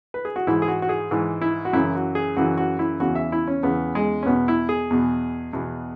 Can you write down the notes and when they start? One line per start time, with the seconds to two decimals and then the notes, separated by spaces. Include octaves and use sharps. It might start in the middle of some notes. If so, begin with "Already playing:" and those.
0.14 B4
0.25 G#4
0.36 F#4
0.47 G#2 E3 E4
0.62 G#4
0.68 F#4
0.82 F#4
0.89 G#4
1.11 G#2 E3
1.42 E4
1.65 F#4
1.73 F#2 C#3 E3 E4
1.95 F#4
2.15 G#4
2.37 F#2 C#3 E3 F#4
2.58 F#4
2.79 E4
3.00 E2 C#3 E3 F#4
3.15 E5
3.32 E4
3.47 C#4
3.63 E2 C#3 E3 B3
3.95 G#3
4.23 C#4
4.26 E2 B2 B3
4.48 E4
4.69 G#4
4.90 E2 B2
5.53 E2 B2